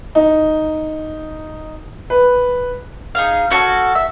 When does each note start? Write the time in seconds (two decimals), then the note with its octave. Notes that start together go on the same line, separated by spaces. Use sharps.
0.15 D#4
2.10 B4
3.15 D#4 G#4 F5
3.50 C#4 F#4 A4
3.95 E5